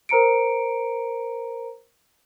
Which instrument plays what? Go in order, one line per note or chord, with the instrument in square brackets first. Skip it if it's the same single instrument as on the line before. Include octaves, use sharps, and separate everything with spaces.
[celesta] A#4 C5 A#5 C#7 D7